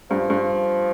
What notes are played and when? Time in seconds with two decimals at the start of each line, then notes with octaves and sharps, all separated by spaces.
0.10 G2 F3
0.30 G2